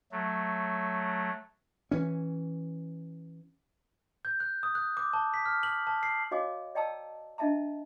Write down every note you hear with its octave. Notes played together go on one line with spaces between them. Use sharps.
F#3 A3
E3 C#4
G6
F#6
D#6
F#6
D6
A5
B6
F6
F#7
A5
C7
F#4 C#5 D#5 F5 G#5 D6
D5 D#5 G5 A5 A#5 E6
D4 D#5 E5 A5 A#5